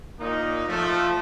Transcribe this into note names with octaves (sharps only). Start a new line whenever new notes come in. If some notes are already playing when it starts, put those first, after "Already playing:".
A#2 A#3 D#4
F3 A3